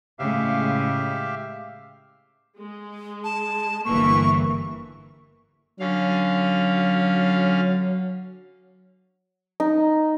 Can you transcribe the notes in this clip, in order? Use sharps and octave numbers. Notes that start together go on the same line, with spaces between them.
A2 C#3 G#3 G4 E5 F5
G#3
A5
G1 E3 A#3 C#6
D3 F#3 C#4 F5
D#4